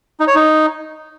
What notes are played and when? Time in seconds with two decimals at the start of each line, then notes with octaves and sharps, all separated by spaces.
0.20 D#4
0.28 C#5
0.35 D#4